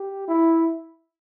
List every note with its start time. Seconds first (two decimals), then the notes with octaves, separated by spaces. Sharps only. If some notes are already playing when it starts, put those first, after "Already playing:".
Already playing: G4
0.28 E4